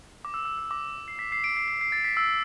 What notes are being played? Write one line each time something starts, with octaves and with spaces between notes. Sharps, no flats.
D6
E6
E6
E6
D6
C7
B6
C7
D7
C7
C7
C7
A6
B6
E6